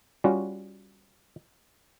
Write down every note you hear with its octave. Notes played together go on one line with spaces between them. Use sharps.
G3 C#4 F4 F#4